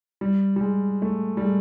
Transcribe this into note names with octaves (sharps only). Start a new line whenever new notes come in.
G3
G3
G#3
A3
G3
G#3